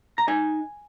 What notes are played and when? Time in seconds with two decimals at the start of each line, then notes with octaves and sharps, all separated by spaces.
0.18 A#5
0.28 D#4 G#5